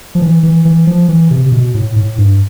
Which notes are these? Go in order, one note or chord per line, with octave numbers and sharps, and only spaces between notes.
F3
E3
E3
E3
F3
E3
C3
C3
B2
A2
A2
G2